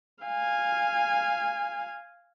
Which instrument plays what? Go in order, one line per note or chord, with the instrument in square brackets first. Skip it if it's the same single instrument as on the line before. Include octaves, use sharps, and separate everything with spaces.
[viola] F5 G#5